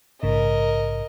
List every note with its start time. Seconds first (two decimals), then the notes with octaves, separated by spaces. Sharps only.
0.23 A#1 G#2 C#3 A#4 D#5